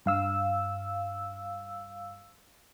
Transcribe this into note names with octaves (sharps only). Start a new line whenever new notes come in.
G2 F5 E6